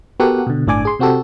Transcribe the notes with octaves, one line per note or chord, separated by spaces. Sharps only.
B3 F#4 G4 A4 A#4 F#5
B2 D3
G1 A2 D4 D5 G#5 D6
G#4 C6
C3 C4 F#4 G4 A4